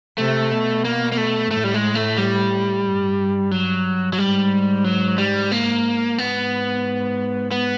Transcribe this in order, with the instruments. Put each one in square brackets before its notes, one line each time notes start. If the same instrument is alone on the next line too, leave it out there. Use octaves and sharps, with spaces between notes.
[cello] C3 [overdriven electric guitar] A3
[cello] B2
[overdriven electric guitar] A#3
A#3
A3
[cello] A2 [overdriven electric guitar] A3
[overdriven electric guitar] G3
G#3
A3
G3
[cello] G2
[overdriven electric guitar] F#3
F#3
[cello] G#2 [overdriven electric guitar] G3
[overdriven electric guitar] F#3
G3
A#3
[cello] G#2 [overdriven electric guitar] B3
[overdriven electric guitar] B3